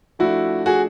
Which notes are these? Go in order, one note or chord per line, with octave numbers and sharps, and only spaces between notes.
F3 A3 D4 E4 F#4
F#4 G#4